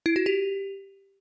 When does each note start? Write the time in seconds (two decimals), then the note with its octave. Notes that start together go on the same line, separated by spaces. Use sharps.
0.06 E4
0.16 F#4
0.26 G4